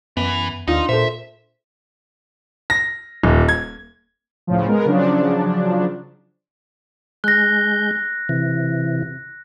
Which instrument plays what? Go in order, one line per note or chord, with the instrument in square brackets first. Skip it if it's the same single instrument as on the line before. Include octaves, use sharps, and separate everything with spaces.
[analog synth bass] F#2 [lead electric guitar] E3 [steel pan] B3
[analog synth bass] D#2 [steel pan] D4 F4 [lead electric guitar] D#4
[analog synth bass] A#2 [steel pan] A4 A#4 C5 [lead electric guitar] E5
[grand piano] A#6
D#1
G#6
[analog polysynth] C#2 A2 C#3 F3
G#3 B3 A#4
C#3 F3 F#3 D4
[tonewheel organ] G#3 G6 [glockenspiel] F#6 A#6
[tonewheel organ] C3 E3